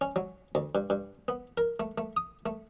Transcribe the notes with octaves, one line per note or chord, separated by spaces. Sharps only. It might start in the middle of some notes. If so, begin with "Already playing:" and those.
C#4
F#3
D2
G2
G2
B3
A#4
A3
A3
D#6
A3